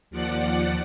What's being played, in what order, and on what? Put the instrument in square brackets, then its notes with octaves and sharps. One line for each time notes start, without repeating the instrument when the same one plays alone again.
[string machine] D#2 F3 D5 F#5